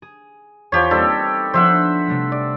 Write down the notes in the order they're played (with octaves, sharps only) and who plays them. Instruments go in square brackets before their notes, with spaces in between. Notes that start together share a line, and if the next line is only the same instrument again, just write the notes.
[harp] G#4
[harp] E2 B4 G#6 [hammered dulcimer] F3 G4 C#5
[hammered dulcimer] G3 A4 [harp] A#3 C4 D#4
[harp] F3 B3 D4 [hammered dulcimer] C5 E5 F#5
[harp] C3 G3 A3
[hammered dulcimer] D5